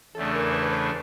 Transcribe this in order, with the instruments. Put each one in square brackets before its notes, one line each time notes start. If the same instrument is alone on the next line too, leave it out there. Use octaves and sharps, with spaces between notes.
[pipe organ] E2 C#3 E3 A3 D4 [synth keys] A4
[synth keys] A#4
B4
C5